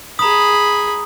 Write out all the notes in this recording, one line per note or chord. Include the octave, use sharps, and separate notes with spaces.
G#4 A#5 B5 D#6